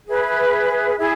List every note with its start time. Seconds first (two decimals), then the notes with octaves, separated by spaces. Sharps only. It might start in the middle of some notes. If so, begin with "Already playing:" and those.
0.07 G#4 B4 E5
0.97 E4 G#4 E5